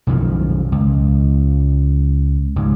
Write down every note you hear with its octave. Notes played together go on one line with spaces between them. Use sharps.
B1 F#2 D#3 F3
C#2
C#2 G#2